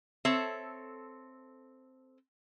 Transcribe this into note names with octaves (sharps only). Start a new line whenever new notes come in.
C4 A4 C#5 E5